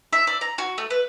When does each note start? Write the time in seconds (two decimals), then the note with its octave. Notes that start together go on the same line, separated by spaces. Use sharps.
0.13 E5
0.27 D5
0.41 A#5
0.58 F#4
0.78 A3
0.90 B4